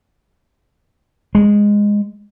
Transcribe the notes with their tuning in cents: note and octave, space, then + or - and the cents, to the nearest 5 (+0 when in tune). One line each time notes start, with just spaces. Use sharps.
G#3 -10